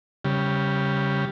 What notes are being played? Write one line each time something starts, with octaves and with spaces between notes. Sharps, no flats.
C#3 G3